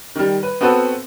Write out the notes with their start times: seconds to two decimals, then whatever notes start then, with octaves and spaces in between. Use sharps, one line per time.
0.16 D#3 G3
0.43 B4
0.61 B3 C4 F#4 A4 B4